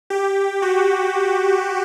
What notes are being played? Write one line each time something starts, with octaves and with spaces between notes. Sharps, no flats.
G4
F#4